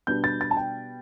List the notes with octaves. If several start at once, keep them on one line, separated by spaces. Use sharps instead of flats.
B2 G3 B3 D4 G6
A6
A6
A5
G5